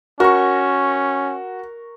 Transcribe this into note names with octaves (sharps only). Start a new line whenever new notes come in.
C#4 F#4 A#4 C#6